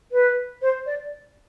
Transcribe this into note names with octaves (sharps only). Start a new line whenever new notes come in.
B4
C5
D5